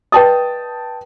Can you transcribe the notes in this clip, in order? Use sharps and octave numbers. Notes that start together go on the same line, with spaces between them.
B4 D5 D#5 G5 A5 D#6